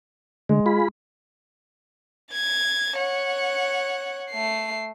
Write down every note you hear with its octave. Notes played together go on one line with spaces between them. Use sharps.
D3 G#3
F4 G#4 B5
G#6 A6
C#5 F#5
A3 C7